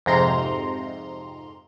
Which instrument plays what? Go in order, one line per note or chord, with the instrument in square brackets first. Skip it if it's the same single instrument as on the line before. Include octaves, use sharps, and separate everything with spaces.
[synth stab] F2 G#2 C3 A#5 C6